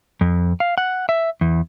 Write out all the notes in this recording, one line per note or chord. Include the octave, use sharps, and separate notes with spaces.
F2
F5
F#5
E5
E2